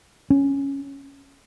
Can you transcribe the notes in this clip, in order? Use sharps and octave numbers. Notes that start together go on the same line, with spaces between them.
C#4